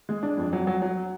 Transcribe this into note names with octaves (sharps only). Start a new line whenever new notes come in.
G#3
D4
F2
F#3
F#3
F#3